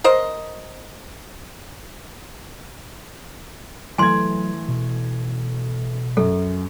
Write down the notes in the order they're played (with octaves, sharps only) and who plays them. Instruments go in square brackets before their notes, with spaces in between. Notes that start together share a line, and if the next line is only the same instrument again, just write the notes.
[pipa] A#4 C5 D#5
[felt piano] E3 A3 G#6 [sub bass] F#3 [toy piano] G#5 C6
[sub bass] B2
[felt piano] F#2 [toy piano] A4